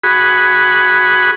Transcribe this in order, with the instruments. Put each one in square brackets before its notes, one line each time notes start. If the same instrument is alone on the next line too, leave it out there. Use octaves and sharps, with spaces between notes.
[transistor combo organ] F#4 G#4 B5